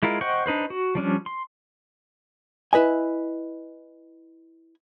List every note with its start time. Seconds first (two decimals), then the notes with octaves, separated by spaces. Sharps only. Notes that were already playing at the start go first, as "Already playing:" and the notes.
0.03 G#3 E4 F4 A#4
0.21 C5 D#5 F#5 G5 C#6
0.46 D4 D#4 B4 C5
0.70 F#4
0.95 F3 G3 C#4 D4
1.26 C6
2.73 E4 B4 D#5 G#5